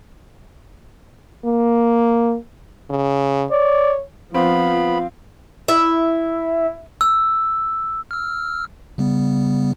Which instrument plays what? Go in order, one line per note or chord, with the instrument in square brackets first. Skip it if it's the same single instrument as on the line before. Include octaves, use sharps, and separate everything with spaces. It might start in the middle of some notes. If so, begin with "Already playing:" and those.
[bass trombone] A#3
[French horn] C#3
[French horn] C#5 [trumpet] D5
[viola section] F3 [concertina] B3 B5 [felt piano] C4 [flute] F5
[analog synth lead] E4 [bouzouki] E5
[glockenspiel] E6
[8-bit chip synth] E6 F6
C#3 G3 B3